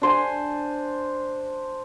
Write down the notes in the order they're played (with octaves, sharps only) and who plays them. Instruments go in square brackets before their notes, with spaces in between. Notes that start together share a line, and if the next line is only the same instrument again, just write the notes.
[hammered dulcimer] D4 C5 G#5